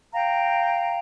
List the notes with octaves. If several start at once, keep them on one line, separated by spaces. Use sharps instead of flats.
F5 G5 A#5